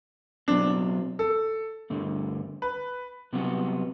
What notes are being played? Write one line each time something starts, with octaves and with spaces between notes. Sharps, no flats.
B2 F#3 C4 D4
A4
G2 D3 A3
B4
C2 C3 F#3 B3 F#4